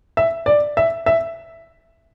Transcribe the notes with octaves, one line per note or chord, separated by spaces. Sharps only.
E5
D5
E5
E5